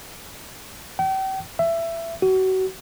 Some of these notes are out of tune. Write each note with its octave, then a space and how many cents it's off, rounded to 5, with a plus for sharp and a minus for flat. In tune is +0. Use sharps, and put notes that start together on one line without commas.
G5 -40
E5 +20
F#4 +30